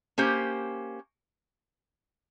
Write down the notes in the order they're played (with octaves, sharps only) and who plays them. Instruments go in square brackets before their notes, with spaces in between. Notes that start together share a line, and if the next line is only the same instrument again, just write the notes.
[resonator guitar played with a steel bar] A#3 C#4 G4 C5